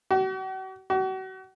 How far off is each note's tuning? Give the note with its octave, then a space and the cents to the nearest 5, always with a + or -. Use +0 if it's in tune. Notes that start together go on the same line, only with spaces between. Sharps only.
F#4 +40
F#4 +35